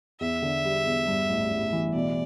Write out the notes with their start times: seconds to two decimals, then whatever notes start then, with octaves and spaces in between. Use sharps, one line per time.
0.21 E2 E5
0.42 D3
0.65 G3
0.86 E2
1.07 G2
1.29 A1
1.51 A1
1.73 E3
1.94 B2 D5